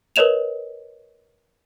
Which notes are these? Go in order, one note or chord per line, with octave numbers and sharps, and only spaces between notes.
A#4 B4 C#5 D#5 E7 F7